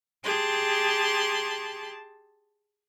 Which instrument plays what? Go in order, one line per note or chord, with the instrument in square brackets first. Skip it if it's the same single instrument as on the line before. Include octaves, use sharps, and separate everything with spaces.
[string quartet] G4 G#4 A5 C6